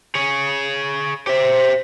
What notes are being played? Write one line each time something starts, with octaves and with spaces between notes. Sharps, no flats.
G#4 C#5
G4 C5 E5